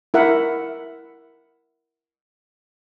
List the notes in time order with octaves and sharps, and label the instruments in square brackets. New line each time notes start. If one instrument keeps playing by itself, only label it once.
[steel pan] E4 A#4 E5 F#5